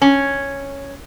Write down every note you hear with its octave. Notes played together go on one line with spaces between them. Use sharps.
C#4